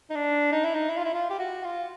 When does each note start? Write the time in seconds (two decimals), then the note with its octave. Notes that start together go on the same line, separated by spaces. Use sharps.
0.10 D#4
0.15 D4
0.52 D#4
0.64 E4
0.75 D#4
0.89 E4
0.97 F4
1.04 E4
1.14 F4
1.30 G4
1.39 F#4
1.64 F4